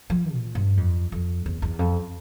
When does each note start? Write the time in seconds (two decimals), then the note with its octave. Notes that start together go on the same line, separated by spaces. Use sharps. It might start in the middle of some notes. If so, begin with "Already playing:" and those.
0.10 F3
0.33 A#2
0.55 G2
0.77 F2
1.12 F2
1.46 E2
1.62 E2
1.79 F2